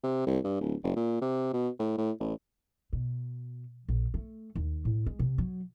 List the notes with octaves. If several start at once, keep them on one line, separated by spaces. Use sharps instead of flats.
C3
C2
G2
D1
F#1
A#2
C3
B2
A2
A2
A1
B2
A#1
A3
D#2
A2
G#3
C3
F#3